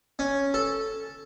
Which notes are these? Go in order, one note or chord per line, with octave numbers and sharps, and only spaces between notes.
C#4
A4